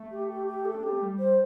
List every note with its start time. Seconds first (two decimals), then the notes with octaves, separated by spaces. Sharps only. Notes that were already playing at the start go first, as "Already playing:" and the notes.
Already playing: A3
0.11 G4
0.28 G4
0.47 G4
0.65 A4
0.75 D4
0.83 C4 G4
0.92 A3
1.02 G3
1.19 C5